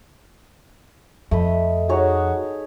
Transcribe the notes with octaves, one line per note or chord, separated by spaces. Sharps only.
F2 A3 D#5 B5
D#4 F#4 G#4 C#5